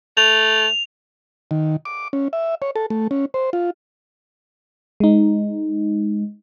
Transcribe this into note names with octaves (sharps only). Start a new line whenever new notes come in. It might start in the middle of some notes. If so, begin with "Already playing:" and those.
A3 F7
D#3
D6
C#4
E5
C#5
A4
A3
C#4
C5
F4
G#3 D#4